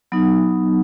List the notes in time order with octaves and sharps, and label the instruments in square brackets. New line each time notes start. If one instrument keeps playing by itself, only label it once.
[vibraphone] F#3 B3 D#4